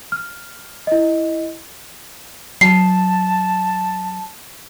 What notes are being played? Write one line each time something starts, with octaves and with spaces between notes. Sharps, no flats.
F6
E4 D#5
F#3 A5 C7